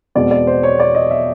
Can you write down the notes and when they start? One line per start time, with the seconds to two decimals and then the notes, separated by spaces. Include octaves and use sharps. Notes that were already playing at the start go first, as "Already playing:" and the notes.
0.15 E2 B2 G#3 C4 D5
0.31 D5
0.47 C5
0.63 C#5
0.80 D5
0.95 D#5
1.11 E5